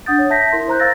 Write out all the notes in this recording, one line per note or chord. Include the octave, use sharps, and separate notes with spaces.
D4 F#5 D#6 G6 A6
C#5
E5 A5 G6 A#6 B6
E4 A#4 C6
C5 A#5 F#6 G6
F5 E6 A6 A#6